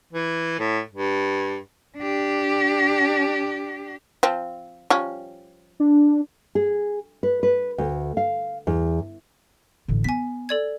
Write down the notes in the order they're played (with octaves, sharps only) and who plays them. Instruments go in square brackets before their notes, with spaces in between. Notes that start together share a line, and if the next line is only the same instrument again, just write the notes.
[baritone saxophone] E3
A2
G2
[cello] D4 G4
[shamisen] F3 C4
F3 G3 C#4
[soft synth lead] D4
[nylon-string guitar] G#4
B4
B4
D2
F5
E2
[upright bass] A1 D3
[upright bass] B3 [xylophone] G#5 B6
[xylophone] A4 D5 G#6